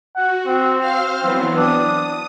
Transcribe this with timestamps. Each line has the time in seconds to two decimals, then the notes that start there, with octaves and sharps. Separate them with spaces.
0.16 F#4 F#5
0.46 C4
0.79 C5 F5 F6
1.21 E3 F#3 B3 C4
1.57 D4 D#6